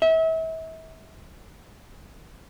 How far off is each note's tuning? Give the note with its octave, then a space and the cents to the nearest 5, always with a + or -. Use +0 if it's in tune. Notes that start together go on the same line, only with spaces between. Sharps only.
E5 -35